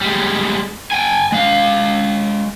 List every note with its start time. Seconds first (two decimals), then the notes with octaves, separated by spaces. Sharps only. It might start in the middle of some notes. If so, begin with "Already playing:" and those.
0.01 G3 G#3
0.92 G5 G#5
1.32 G#3 F5